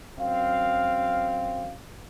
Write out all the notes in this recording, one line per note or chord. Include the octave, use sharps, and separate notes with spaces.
F#2 C4 F5